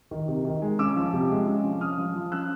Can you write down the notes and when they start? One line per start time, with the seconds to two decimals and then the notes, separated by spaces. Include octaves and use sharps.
0.11 D#3
0.28 C3
0.45 D#3
0.62 G#3
0.79 C#4 D6 E6
0.96 F3
1.13 C3
1.30 G#3
1.47 C#4
1.64 F3
1.81 C#4 D#6 F6
1.98 F3
2.14 F3
2.32 C#4 E6 F#6